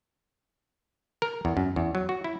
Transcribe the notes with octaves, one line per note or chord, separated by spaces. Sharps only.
A#4
E2
F#2
E2
F#3
F#4
E4